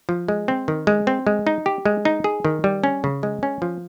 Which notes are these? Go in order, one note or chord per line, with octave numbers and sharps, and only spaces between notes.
F3
G#3
C4
D#3
G#3
C4
G#3
D#4
G4
G#3
D#4
G#4
D#3
G3
C#4
C#3
G#3
C#4
F3